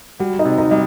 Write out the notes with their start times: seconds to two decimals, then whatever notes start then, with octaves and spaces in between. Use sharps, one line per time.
0.20 G3 F#4 F#5
0.39 D#4 D#5
0.45 C3
0.58 D#4 D#5
0.71 G3 D#5